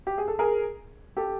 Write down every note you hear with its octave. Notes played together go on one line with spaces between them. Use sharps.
G4
G#4
A4
G#4 A#4
G4 A4